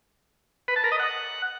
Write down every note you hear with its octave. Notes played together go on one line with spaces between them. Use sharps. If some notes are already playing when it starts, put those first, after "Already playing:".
B4
A5
A#4
D#5
F#5